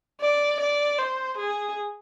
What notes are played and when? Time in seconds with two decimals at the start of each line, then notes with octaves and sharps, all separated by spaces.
0.21 D5
0.60 D5
0.98 C5
1.37 G#4